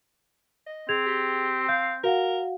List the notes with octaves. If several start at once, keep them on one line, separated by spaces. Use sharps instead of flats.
D#5
C4 G#4 G#6 F7
G4
F5 G6
F#4 A#4 F5 F#5